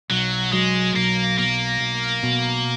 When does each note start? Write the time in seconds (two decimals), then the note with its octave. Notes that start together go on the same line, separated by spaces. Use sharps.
0.10 B1 F#3
0.52 F#3 G#3
0.96 B1 A#3
1.38 B2 A#3
1.81 B1
2.23 B2